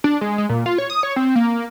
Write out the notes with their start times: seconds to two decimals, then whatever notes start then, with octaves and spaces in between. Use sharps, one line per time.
0.04 D4
0.21 G#3
0.38 G#3
0.49 A#2
0.66 F4
0.78 C#5
0.90 D#6
1.03 C#5
1.16 C4
1.35 A#3